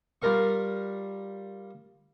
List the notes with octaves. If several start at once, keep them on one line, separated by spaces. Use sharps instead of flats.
G3 F4 A#4 F5 C#6